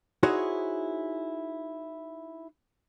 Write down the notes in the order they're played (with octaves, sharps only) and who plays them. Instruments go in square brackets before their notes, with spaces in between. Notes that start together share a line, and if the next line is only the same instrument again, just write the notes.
[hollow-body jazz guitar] D#4 E4 F#4 G#4 C5 C#5